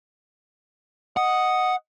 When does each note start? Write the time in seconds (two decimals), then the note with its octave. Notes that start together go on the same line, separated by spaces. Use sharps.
1.17 D#5 F#5